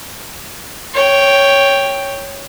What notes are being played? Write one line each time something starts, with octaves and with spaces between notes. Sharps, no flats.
C#5 G5